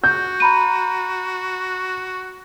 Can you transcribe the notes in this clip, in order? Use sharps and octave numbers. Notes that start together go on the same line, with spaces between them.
F#4 G6
A#5 B5 D#7